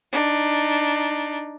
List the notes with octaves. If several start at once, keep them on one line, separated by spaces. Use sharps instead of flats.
D4 D#4